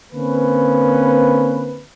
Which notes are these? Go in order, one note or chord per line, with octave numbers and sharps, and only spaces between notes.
D3 A#3 C4 C#4 B4